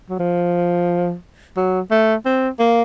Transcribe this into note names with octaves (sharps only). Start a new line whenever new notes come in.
F#3
F3
F#3
A3
C4
A#3